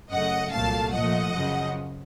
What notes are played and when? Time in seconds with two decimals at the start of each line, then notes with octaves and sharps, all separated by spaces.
0.11 F#2 C#3 A3 D#5 F#5
0.52 C2 A#2 F#3 A3 F5 A5
0.93 A#2 F3 A3 D#5 F#5
1.34 F#2 C#3 F3